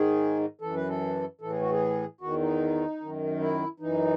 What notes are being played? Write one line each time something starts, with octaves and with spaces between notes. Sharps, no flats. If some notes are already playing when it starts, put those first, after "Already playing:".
Already playing: G#2 D#3 G#4
F#2 E3 A4
B4
A4
A2 E3 A4
G#4
F#4
G#4
E2 D#3 F#4
D#4
F#2 D#3
E4
F#2 E3 D#4